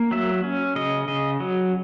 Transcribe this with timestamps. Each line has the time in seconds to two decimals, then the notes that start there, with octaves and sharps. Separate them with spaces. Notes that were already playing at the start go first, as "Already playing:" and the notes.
Already playing: A#3
0.11 F#3 E5
0.44 C#4
0.75 C#3 D#5
1.08 C#3 D#5
1.40 F#3